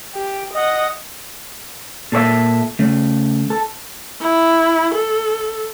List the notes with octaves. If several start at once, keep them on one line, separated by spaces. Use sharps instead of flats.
G4
D#5 F#5
A#2 A4 C#5 E5
C#3 A3
A4
E4
A4